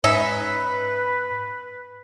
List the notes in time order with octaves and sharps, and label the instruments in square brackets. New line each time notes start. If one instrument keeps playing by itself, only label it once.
[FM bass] G#2 [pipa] C#4 D#4 E5 [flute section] B4